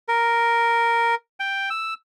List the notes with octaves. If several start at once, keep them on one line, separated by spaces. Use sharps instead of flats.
A#4
G5
E6